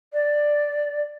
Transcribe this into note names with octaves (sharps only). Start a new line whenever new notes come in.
D5